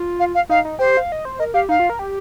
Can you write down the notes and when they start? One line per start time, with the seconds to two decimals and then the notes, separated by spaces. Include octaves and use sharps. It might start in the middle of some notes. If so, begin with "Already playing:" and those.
Already playing: F4
0.20 F5
0.35 F5
0.49 D#4 F5
0.65 D#4
0.79 G4 C5
0.97 F5
1.12 D#5
1.25 C5
1.39 A#4 D#5
1.54 G4 F5
1.69 D#4 F5
1.80 F4
1.90 A#4
1.99 G4